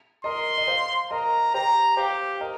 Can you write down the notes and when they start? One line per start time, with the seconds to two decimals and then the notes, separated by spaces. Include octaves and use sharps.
0.24 A#4 D#5 C6
0.58 D#5
0.68 C5 F5
1.11 A#4 D#5 A#5
1.54 G4 C5 A#5
1.97 G4 C5 F5
2.41 A#4 D#5